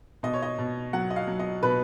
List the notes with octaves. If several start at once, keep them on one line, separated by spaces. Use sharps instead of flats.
B2 D#5
C#5
D#5
B2
F#3 F#5
D#5
F5
F#3
D#5
B2 B4